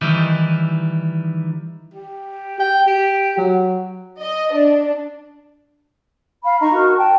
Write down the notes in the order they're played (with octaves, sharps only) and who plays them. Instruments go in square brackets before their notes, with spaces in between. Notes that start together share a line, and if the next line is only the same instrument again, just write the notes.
[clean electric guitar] D#3 E3 G3 D#4 E4
[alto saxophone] G4
G5
G4
F#3
[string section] D#5
D4
[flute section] F5 B5
D#4 D#5 A#5 C#6
F#4 A#4 C#6
G5 A5